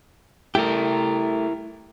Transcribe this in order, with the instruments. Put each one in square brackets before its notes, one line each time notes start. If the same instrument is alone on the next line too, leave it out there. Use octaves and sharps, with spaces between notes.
[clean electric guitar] A3 G4 [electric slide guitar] E4 A#4